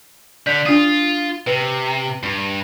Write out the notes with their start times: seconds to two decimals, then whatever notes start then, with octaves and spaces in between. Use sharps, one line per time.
0.47 D3 D5 G6 B6
0.66 D4 F4 D#6
1.47 C3 B4
2.23 G2